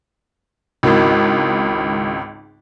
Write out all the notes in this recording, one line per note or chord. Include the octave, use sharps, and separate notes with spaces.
G#1 C#2 E4 F#4 A#4